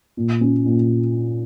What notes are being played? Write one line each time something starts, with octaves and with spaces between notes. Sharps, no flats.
A#2
C#4
A#2